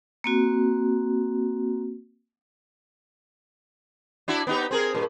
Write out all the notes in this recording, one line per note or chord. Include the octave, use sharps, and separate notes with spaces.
A#3 C4 F#4
D4 E4 F#4
B3 D#4 G4
C4 G#4 A#4
G2 A#2